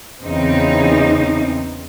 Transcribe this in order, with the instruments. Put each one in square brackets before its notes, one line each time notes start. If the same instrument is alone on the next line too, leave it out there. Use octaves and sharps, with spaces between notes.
[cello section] E2 C#3 E3 C4 D#4